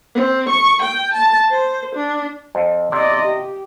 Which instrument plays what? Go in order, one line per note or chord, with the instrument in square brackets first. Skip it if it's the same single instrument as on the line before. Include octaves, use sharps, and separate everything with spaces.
[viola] C4
C#6
G5
A5
C5
D4
[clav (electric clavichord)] F2
[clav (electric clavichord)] C3 [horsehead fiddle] D5 D#5
[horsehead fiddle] G4